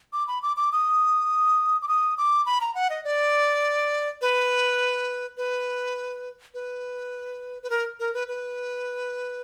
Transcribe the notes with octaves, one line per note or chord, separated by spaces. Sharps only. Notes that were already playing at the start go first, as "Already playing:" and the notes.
D6
B5
D6
D6
D#6
D6
D#6
D6
B5
A#5
F#5
D#5
D5
B4
B4
B4
B4
A#4
A#4
B4
B4